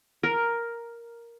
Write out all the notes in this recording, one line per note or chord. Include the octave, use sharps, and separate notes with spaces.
A#4